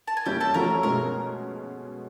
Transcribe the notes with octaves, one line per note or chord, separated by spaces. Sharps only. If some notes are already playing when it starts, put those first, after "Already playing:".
A5
G#5
G3 A#3 C#4 E4 G4 G5
A4 A5
F3 A3 C#4 F#4 A4 A#4 A#5
B2 G#3 C#4 A#4 A#5